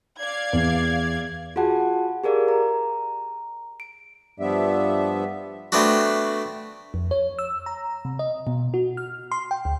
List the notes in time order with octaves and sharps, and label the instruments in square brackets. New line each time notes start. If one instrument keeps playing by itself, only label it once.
[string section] D5 F5 G#6
[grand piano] E2
[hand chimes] F4 F#4 G#4 F#5 A5
G4 G#4 A#4 D5 F5
A#5
D7
[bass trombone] G2 [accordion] F3 B3 E5 [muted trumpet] D5
[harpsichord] A3 B3 C4 D4 F#4
[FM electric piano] F2
C#5
E6
A#5
C3
D#5
B2
F#4
F6
C6
G5
D2